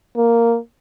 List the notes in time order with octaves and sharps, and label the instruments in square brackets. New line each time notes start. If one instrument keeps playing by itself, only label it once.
[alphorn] A#3